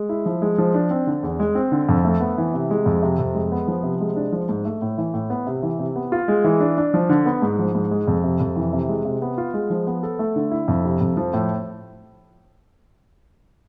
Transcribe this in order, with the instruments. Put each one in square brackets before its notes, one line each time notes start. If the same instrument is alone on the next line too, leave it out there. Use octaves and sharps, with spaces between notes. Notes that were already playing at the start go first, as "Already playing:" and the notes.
Already playing: [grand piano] G#3
E4
F3
G#3
F3
D4
C4
D3
E2
G#3
C4
D3
F2
A3
B3
E3
C3
G#3
F2
C3
F2
G#3
B3
F3
C3
G#3
D4
F3
G#2
A3
A2
E3
A2
B3
C3
E3
C3
B3
F4
G#3
E3
D4
D4
F3
D3
B3
G#2
F3
G#2
G#3
F2
C3
F2
E3
C3
G#3
C3
B3
F4
G#3
F3
B3
A4
A3
D3
E4
F2
C3
F2
F3
A2